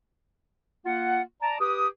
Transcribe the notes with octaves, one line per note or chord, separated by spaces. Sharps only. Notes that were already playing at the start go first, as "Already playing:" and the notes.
A#3 F4 F#5
D5 A5 A#5
G4 B4 D#6